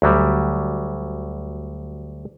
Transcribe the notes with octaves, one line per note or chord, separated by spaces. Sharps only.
D2 F#3 G3